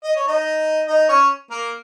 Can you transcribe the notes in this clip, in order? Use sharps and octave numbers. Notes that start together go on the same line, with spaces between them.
D#5
C#5
D#4 D#5
D#4 D#5
C#4 C#5
A#3 A#4